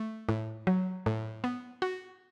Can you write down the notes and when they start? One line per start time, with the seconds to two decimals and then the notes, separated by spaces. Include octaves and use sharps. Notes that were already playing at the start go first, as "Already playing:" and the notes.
Already playing: A3
0.29 A2
0.67 F#3
1.06 A2
1.44 B3
1.82 F#4